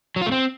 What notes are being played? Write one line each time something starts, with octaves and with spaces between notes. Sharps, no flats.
F#3
F4
A3
C4